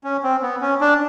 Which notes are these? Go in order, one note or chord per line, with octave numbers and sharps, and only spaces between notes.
C#4
C4
B3
C#4
D4